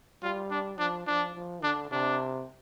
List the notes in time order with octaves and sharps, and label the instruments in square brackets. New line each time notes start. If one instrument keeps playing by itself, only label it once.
[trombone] G3 [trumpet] F4
[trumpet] D4
[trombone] F3 [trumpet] D4
[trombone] F3 [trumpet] D4
[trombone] F3
[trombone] D3 [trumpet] D4
[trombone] C3 [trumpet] D4